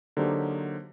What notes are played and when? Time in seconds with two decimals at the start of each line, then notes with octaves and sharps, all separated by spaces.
0.17 D3 F#3 A#3 D#4 G4 C5